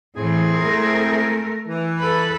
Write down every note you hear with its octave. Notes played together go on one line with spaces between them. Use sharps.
A2 E3 C4 E4 G#4
A3 A#4
E3
A4 B4